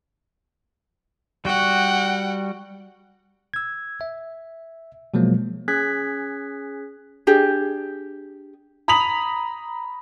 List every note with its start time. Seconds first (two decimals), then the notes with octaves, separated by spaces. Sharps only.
1.45 G3 F#4 F#5 G5
3.54 E6 G#6
4.01 E5
5.14 B2 F3 F#3 G#3 A#3
5.68 C#4 G#4 F#6 G#6 B6
7.27 D4 G4 G#4
8.88 A#5 B5 D#6 B6 F7 F#7